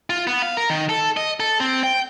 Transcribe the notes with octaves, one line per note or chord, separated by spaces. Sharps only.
F4
B3
F5
A#4
D#3
A4
D#5
A4
C4
G5